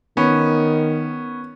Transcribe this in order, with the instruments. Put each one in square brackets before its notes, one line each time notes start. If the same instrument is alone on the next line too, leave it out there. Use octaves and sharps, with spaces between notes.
[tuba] D#3 [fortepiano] B3 C#4